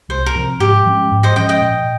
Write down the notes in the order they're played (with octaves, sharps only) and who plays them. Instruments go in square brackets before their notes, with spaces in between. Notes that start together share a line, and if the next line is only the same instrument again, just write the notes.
[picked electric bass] C2 [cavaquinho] C5
[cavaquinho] A#4
[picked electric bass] C3 F3
[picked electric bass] G#2 [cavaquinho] G4
[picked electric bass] F3 G#3 C#4
G#2
[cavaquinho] C5 D#5
[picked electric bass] F3 G#3 C#4 [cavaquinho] D#5 G5
[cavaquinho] D#5 G5
[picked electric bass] A#2